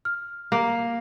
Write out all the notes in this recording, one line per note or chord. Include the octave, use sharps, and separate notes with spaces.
F6
A#3